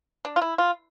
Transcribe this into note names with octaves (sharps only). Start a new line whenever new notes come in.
D4
F4
E4
F4